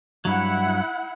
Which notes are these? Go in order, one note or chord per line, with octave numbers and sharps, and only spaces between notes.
G2 F#3 E4 F#5